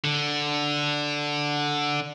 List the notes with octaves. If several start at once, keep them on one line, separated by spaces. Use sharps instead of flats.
D3